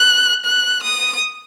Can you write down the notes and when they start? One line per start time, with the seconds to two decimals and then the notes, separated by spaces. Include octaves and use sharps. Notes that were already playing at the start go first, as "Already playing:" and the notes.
Already playing: F#6
0.45 F#6
0.83 D#6